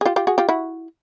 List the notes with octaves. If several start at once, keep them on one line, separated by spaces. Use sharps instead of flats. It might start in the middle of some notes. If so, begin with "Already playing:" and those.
G#4
F4 G4
F4 G4
F#4 G#4
F4 G4
E4 F#4